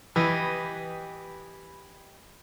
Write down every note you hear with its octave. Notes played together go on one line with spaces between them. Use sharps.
E3 G4 B4 D#5